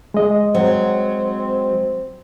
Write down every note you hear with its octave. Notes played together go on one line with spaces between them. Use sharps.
G#3 D#5
F#3 C4